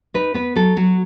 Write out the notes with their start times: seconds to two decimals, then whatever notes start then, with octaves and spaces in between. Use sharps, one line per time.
0.14 D#4 B4
0.34 B3 B4
0.56 F#3 A4
0.76 F#3 F#4